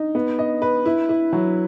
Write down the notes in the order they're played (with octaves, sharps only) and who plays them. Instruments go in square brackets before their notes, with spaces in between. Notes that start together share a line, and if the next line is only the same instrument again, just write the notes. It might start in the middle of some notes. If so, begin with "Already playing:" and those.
Already playing: [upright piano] D#4
B3
D#5
B4
E4
E4
F#3